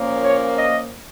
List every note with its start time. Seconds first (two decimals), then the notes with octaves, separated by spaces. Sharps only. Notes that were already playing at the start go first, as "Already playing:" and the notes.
Already playing: A#2 F3 A#3 C#4
0.24 C#5
0.58 D#5